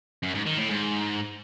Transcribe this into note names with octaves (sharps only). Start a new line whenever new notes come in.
F#2
G#2
D#3
A2
G#2